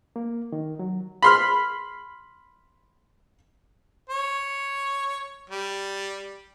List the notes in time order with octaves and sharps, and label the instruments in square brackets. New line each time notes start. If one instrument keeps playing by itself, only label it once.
[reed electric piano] A#3
D#3
F#3
[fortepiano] B5 C6 F6
[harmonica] C#5
G3